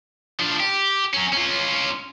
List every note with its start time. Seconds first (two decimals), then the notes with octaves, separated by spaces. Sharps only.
0.40 F3 D4
0.60 G4
1.14 F#3 C#4
1.33 C#4 F4